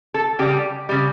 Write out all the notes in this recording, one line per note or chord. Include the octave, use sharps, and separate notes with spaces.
A4
C#3 G3 G4
C#3 G3